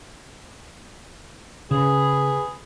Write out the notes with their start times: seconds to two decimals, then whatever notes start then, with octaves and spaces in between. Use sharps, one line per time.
1.71 C#3 G#4 B4